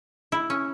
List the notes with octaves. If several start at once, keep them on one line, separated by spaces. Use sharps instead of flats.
E4
C#4